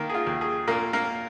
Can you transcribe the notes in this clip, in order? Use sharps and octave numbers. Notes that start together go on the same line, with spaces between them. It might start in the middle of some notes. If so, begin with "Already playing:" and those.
Already playing: D#3 A#3 A#4
G#4
F4
D#2
G#4
A#2 A#3 A#4
A#3 A#4